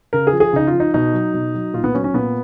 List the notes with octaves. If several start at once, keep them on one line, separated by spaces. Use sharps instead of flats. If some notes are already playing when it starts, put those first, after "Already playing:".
C#3 A#4
G#4
F3
G#4
C#3 D#4
F4
F3
D#4
B2 D#4
F#3
B2
F#3
A#2 F4
B3
F#3 C#4
C#4
A#2 B3